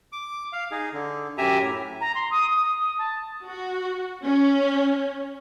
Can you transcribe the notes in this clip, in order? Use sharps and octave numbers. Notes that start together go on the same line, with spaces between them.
D6
F5
D#4 G#4
D3
F#2 G4 E5 G#5 A#5
A2
A#5
C6
D#6
D#6
A5
F#4
C#4